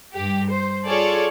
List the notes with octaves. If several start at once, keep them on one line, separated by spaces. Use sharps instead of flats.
G2 G4
C5
F4 G#4 A4 C#5 D5